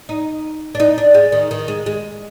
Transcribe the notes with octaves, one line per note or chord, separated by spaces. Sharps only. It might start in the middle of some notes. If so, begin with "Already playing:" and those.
D#4
D4
D#4
D4
G#3
D#3
D#3
G#3
G#3